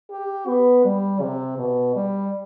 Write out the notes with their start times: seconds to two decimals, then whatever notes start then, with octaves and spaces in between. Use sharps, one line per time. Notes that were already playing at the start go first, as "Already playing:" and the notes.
0.11 G4
0.47 B3
0.85 G3
1.21 C3
1.59 B2
1.96 G3